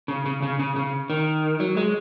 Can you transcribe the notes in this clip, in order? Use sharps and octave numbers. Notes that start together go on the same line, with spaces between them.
C#3
C#3
C#3
C#3
C#3
D#3
F#3
G#3